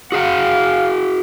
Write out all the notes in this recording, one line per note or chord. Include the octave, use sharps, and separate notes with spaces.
F#4 G#4 F5 F#5